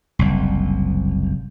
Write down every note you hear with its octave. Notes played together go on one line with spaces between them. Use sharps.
F#1 C2